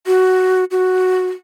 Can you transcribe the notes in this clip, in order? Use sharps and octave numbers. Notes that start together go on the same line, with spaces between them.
F#4
F#4